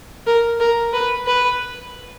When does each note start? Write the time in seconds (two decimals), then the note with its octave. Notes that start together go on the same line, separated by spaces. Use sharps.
0.27 A#4
0.60 A#4
0.93 B4
1.27 B4